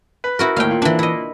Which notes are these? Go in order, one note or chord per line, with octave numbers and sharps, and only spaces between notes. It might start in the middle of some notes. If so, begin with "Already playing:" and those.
B4
E4 F#4 A#4
D#2 A2 F5 G5
A#2
E3 D4
E4 D#5